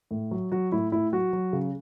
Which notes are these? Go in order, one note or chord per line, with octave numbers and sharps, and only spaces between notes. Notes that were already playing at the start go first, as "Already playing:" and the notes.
A2
F#3
F#3 F#4
A2 E4
A2 E4
F#3 F#4
F#3
C#3